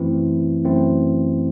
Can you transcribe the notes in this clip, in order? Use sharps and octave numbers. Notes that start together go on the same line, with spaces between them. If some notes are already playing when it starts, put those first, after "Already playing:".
Already playing: F#2 E3 A3 C4 E4
F#2 E3 A3 C4 E4